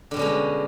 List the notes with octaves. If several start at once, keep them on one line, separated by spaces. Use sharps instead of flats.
B2 D3 G3 G#3 C#4